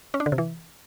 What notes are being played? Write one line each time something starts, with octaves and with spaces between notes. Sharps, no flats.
C#4
D4
D3
C3
E3